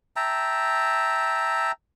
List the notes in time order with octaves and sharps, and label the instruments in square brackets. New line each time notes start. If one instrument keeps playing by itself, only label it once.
[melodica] E5 G5 A5 A#5